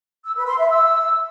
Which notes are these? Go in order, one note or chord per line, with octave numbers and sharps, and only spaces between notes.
E6
B4
C6
E5
E6